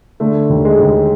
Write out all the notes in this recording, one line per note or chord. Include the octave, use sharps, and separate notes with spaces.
D3 A3
D#2
G#3
D#2